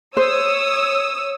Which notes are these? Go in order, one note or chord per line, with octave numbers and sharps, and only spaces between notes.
C5 C#5 D#6 E6